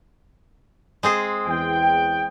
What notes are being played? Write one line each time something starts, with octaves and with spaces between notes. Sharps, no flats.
G#3 C4 G#4
E2 G5